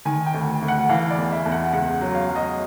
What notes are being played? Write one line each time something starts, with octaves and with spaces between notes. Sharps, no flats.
D#3 G#5
G5
D2
D2
F#5
E3 F5
D5
E2
E5
E2
F#5
C#2 F#5
F#3
F5
F#3
D#5